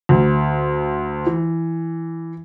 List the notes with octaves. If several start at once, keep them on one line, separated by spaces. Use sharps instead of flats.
D2
E3